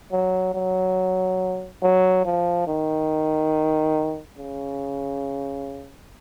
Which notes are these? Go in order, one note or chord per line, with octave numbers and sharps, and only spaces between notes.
F#3
F#3
F#3
F3
D#3
C#3